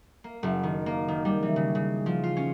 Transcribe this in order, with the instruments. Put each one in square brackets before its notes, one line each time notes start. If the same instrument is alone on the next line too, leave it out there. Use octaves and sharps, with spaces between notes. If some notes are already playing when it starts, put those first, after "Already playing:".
[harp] A#3
F#1
D#3
A#3
D#3
G3
E3
C#3
C#3
F3
F4
C#4